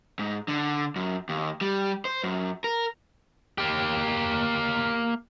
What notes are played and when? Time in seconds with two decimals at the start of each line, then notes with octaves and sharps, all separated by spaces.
0.19 G#2
0.48 D3
0.96 F#2
1.29 D#2
1.61 G3
2.05 C5
2.24 F#2
2.64 A#4
3.58 A#3 G4